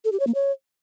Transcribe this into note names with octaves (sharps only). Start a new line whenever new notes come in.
A4
G4
C#5
A#3
C#5